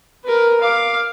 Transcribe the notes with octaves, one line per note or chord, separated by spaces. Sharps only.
A#4 B4
F5 D6